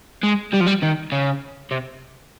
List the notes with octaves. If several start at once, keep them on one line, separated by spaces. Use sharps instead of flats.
G#3
G3
F3
G3
D#3
C#3
C3